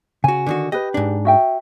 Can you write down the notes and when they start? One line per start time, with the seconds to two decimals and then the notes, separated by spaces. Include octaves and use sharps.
0.24 C#3 F#4 G#5
0.46 D3 D#3 F#4
0.72 G4 B4 D#5
0.94 G#2 D4
1.25 F#4 E5 G5